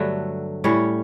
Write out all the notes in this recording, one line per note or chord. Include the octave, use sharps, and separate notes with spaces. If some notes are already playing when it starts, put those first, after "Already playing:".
Already playing: G2 D3 F#3 A3
A2 G3 C#4 C#5